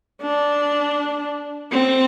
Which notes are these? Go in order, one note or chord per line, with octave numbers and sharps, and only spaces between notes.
D4
C4